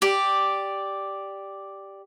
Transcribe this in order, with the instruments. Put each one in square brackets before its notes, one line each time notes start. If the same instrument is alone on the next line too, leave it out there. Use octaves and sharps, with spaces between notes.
[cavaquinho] G4 D5